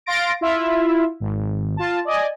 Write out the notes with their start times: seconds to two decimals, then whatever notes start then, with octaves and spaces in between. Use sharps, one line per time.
0.06 F5 C6 A6 A#6 D7
0.41 E4 F4 E5
1.20 G#1
1.77 F4 A5
2.05 D5 D#5 G#5